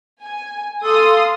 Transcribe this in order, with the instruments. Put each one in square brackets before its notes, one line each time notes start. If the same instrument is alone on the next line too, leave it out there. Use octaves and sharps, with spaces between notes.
[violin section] G#5
[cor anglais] A4 [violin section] F5 C6 D#6